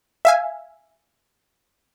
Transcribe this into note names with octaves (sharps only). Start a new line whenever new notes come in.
E5 F5 G#5